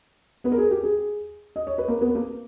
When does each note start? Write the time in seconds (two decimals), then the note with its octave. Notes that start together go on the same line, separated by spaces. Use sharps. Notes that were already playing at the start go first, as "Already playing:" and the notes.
0.44 B3 B4
0.52 A#4
0.58 G#4
0.71 G4
0.83 G#4
1.56 D#5
1.67 C#5
1.78 B4
1.88 A#3 A#4
2.01 B3 B4
2.15 A#3 A#4